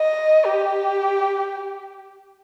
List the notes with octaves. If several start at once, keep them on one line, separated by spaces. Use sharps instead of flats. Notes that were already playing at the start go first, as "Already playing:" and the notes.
Already playing: D#5
G4